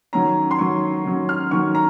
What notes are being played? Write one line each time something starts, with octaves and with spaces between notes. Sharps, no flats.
D#3 F#3 C#4 A#5
C6
D#3 F#3 C#4 C#6
D#3 F#3 C#4
F6
D#3 F#3 C#4 C#6
A#5